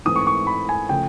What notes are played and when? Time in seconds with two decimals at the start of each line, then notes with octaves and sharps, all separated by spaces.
0.05 G#2 E3 A3 C4 D#6
0.16 C#6
0.27 C#6
0.47 B5
0.69 G#5
0.89 C#3 F3 A3 G5